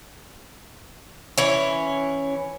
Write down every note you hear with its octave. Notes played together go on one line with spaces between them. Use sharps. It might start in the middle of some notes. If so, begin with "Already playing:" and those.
E3 C#4